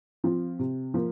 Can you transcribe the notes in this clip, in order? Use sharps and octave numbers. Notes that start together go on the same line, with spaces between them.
F3 C4 F4
C3
F3 A#3